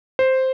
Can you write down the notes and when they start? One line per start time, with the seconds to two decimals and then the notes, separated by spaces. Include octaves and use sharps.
0.19 C5